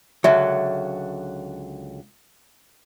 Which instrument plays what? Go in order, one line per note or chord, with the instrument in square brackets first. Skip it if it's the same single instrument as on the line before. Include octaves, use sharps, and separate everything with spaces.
[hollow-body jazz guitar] C#2 D3 F#3 [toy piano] E5